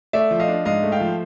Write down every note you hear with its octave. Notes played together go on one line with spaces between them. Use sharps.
A3 D5 E5
F3
D#5 F5
D4
G#2 D#5 F5
A3
F5 G5
F3